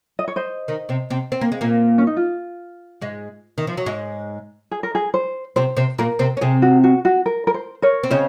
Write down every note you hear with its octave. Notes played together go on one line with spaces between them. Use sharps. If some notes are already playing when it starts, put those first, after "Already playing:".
D#5
C#5
C5 D#5
D#3 D#4
C3 C4
C3 C4
C4
A#3
G#3
A#2 A#3
C#4
D#4
F4
G#2 G#3
D#3
F3
F#3
G#2 G#3
G#4
A#4
G#4
C5
C3 C4 C5
C3 C4
A#2 A#3 A#4
C3 C4
C#4
C3 C4 G#4
F#4
F#4
F#4
A#4
A#4
C5
A#4 C#5
C4
C#3 C#4 C5 D#5